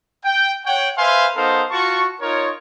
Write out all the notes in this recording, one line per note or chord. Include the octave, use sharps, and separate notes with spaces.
G5
C#5 F#5 G5
B4 C5 E5 F5 G#5 C6
B3 D#4 A4 A#4 C5 F5
F4 F#4 A5 C#6
D#4 F4 A#4 C#5